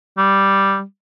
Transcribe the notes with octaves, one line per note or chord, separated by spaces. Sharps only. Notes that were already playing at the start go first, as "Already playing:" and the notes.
G3